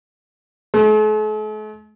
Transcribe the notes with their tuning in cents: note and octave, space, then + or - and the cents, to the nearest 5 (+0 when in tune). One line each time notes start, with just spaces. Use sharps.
A3 -45